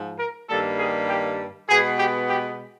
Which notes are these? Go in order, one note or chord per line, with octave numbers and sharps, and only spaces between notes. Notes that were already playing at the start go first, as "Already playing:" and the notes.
Already playing: G#2 F3
A#4
G2 D#3 G3 A#3 A4
G#4
G4
B2 G#3 B3 G#4
G4
G4